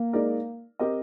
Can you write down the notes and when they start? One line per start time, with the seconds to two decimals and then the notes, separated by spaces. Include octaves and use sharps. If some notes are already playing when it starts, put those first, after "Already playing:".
Already playing: A#3
0.13 G#3 D#4 A#4 D5
0.79 C4 G4 A#4 D#5